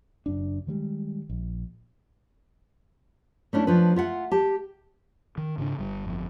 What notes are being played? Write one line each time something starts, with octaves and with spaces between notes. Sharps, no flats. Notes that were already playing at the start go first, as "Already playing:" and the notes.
F#1 F#2 D4
D#3 F3 G3 G#3
A#1
A3 C#4 D4 E4
F3 C#4 D4 B4
F4 E5 F#5
G4 A5
D#3
G#2 C#3 D4
G1 G3
G1 F2